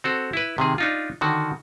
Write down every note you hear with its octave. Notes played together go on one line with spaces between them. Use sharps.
C4 F#4 A4
E4 B4
C3 D#3 G#4
D4 D#4 F4
D3 D#3 F#4